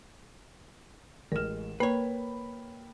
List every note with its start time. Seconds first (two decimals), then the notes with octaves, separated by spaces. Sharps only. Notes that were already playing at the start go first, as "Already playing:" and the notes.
1.32 A1 G#3 A#4 F6 E7
1.80 A#3 A#4 B4 C#5 G5 B5